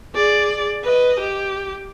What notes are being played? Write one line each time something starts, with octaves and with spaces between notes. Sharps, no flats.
G#4 D5
B4 D#5
G4